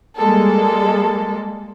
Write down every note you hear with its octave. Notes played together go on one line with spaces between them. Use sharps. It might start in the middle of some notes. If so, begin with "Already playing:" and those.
G3 G#3 A#3 A4